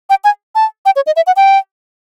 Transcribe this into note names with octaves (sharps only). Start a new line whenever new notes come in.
G5
G#5
A5
G5
C#5
D#5
E5
F#5
G5